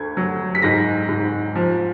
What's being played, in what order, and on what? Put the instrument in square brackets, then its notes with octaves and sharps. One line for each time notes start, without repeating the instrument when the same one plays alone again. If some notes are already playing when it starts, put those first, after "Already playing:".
Already playing: [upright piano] D2 G#6
F#3
B6
G#2 A#6
G#2
F3